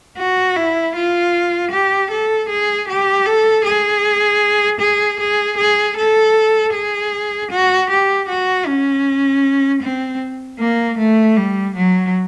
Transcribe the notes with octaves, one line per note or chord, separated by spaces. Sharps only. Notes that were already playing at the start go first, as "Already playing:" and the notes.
F#4
E4
F4
G4
A4
G#4
G4
A4
G#4
G#4
G#4
G#4
A4
G#4
F#4
G4
F#4
C#4
C4
A#3
A3
G3
F#3